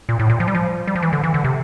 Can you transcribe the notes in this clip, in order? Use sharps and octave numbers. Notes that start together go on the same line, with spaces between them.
A#2
A2
A#2
F3
G3
F3
G3
F3
E3
D3
E3
D3
C3